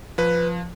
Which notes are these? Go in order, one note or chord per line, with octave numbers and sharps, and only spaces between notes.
F3 B4